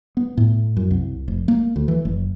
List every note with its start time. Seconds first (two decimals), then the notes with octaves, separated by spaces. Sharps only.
0.17 B3
0.37 A2
0.77 F#2
0.91 C2
1.28 F1
1.48 A#3
1.76 D2
1.88 E3
2.05 F#1